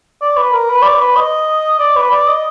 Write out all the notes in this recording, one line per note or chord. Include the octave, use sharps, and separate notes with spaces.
D5
B4
A#4
B4
D5
B4
D#5
D5
B4
D5
D#5